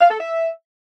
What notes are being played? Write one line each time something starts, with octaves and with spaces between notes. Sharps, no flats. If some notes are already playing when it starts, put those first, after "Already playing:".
F5
A4
E5